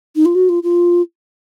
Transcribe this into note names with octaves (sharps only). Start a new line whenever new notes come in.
D#4
F4
F#4
F4
F4